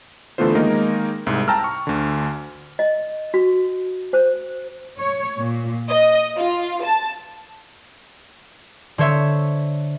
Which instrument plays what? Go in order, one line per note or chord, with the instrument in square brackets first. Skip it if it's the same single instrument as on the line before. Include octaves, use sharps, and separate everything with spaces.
[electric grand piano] D3 E3 A3 B3 F4 C5
D#3 G#3 A#3 D#4 A#4
C2 G#2
G5 A5 A#5 E6 F6
C#6
D2 D3
[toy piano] D#5
F#4
C5
[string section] C#5
A#2
D#5
F4
A5
[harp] D3 C5 C#5 E5 E6